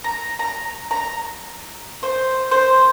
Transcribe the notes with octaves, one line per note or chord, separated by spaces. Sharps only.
A#5
A#5
A#5
C5
C5